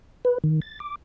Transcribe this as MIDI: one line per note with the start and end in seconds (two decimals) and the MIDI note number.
0.25 0.38 71
0.44 0.60 51
0.62 0.79 93
0.80 0.96 86